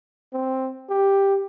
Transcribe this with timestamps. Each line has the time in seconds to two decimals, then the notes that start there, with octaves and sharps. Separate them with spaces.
0.33 C4
0.90 G4